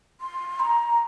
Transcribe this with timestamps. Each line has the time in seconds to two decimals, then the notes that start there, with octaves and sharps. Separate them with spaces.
0.21 C6
0.60 A#5